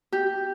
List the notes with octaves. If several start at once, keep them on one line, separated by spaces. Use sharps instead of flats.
G4